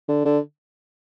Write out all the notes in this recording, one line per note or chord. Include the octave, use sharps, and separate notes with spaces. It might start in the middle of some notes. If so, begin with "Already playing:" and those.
D3
D3